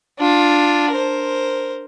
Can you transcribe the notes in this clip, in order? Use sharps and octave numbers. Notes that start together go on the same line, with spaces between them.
D4 F4
A#4 C5